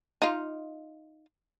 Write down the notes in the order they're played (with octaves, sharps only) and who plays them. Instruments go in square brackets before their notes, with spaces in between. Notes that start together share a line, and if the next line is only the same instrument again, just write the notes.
[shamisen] D#4 F4